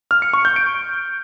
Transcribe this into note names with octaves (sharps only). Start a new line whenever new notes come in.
F6
C#7
C#6
G6
D7